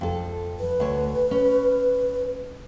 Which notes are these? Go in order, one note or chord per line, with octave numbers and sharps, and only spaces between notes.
F2 A4
B4
D2 C#5
C#4